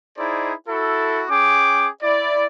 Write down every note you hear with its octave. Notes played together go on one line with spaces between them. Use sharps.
D#4 E4 G#4 C5 D5
E4 F#4 A4
C#4 G#4 G5 D6
E4 D5